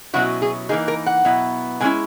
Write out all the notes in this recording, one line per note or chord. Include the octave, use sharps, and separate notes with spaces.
B2 F#3 C#4 E4 F#4
G#4
E3 A#3 D#4 G#4
A#4
F#5
B2 F#3 B3 E4
B2 G#3 C#4 E4 G#5